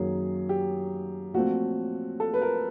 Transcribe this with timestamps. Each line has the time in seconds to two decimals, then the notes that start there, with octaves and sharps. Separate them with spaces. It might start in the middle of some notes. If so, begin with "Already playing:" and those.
Already playing: F#2 D#3 F#3 A#3 G#4
0.49 G4
1.34 A#2 F3 A3 C4 F#4
2.20 A4
2.34 B4
2.42 A#4